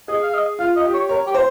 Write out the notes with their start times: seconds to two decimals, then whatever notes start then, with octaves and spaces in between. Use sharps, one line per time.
0.08 G#4 D#5
0.23 F5
0.34 D#5
0.59 F4 F5
0.76 D#5
0.85 G4
0.93 C#5
1.09 A#4 C#5
1.26 G4
1.34 C5